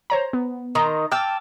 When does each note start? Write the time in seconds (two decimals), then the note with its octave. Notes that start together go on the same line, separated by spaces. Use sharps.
0.10 C5 C#5 A#5
0.33 B3
0.75 D#3 A#5 C6
1.12 G5 A5 D6 E6 F6